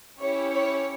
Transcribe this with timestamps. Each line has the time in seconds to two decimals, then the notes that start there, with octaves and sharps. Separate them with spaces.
0.19 C#4 E4 G4 C#5
0.50 C#5